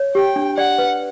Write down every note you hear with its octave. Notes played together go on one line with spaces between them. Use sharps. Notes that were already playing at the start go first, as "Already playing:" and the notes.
Already playing: C#5
G4 G5
D4
D5 F#5
B4